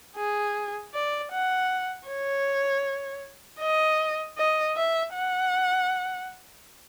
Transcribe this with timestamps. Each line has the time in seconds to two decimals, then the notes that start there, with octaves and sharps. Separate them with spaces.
0.17 G#4
0.94 D5
1.32 F#5
2.08 C#5
3.60 D#5
4.38 D#5
4.76 E5
5.14 F#5